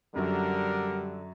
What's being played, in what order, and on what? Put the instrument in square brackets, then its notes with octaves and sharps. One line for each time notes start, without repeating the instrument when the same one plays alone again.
[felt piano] F#2 F#3 [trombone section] D3 [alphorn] G3 [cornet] A#4